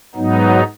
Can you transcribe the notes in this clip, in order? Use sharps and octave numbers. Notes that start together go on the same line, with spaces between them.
G#2 F#3 B3 D#4